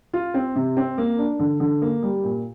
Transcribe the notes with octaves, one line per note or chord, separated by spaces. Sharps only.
F4
C4
C3
C4
A#3
D4
D3
D3
A#3
G3
A#2